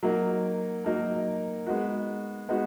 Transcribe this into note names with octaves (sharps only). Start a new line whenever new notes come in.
F#3 A#3 D#4 A#4
F#3 A#3 D#4 A#4
G#3 B3 D#4 F#4
G#3 B3 D#4 F#4